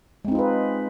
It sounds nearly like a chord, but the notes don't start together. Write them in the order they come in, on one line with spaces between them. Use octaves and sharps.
G#3 C4 D#4 F4 B4